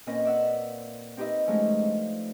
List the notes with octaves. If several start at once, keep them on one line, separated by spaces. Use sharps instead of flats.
A#2 C4 C#4 B4 D#5
D5 E5 F#5
C4 D#4 G4 B4 D#5 E5
F3 G#3 A3 C#4 D#4
D4